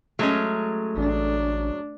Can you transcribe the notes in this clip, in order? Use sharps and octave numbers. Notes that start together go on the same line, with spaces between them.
F#3 G#3 A3 C#4
A1 D4